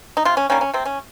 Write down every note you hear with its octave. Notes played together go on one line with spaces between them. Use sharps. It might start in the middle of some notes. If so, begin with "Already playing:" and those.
D#4
C3 F4
C#4
D#3 G3 A#3 C#4
C#4
C3 C4
C#4